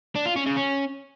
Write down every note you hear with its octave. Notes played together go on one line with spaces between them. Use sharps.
D4
F4
C#4
C#3
C#4